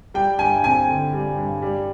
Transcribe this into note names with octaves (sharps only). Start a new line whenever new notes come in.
G3 G5
G2 G#5
C4 G#5
D3
G3
G2
G3